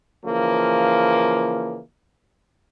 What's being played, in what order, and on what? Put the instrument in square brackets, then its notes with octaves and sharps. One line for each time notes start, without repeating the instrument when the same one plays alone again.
[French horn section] C#3 E3 F3 A#3